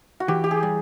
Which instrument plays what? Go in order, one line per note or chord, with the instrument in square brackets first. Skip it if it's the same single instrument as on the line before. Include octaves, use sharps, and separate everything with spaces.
[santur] F#4
[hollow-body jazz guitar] E3 [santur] G4
[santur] G4
G#4
[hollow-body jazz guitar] G3